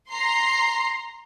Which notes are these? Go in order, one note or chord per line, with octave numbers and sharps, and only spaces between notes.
A#5 C6 C7